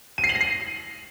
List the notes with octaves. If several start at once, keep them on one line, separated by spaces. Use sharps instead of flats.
D#7
C7
F#7
A#6
C7